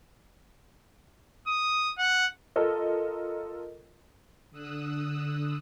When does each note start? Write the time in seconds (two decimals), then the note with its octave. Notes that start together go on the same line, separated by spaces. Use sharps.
1.47 D#6
1.98 F#5
2.56 F4 A4 A#4 D#5
4.51 D3 D#6 E6 F#6